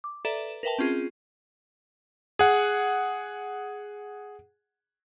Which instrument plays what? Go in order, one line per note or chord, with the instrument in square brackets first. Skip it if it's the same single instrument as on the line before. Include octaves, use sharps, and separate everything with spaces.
[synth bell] D6
A4 B4 D5 E5 A#5
A#4 B4 E5 G5 A5
C4 C#4 F4 G#4
[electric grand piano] G#4 F#5